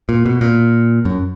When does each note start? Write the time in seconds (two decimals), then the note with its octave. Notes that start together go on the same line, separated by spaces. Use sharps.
0.09 A#2
0.26 B2
0.41 A#2
1.05 F#2